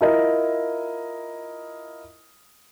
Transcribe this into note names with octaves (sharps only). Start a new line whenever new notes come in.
E4 F4 A#4 D#5